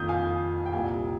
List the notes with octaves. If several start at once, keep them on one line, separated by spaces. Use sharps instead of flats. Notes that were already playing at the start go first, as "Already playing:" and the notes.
Already playing: F2 D#3 A#3 D#6 G6
F5 G#5
G5
C2 A#2 G3 A#3 F5 G#5